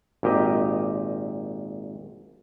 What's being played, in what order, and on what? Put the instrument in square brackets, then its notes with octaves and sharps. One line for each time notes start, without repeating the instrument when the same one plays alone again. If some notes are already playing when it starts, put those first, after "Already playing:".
[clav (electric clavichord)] G#1 A#2 G4 D#5